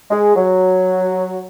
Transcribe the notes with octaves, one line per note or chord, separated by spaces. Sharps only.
G#3
F#3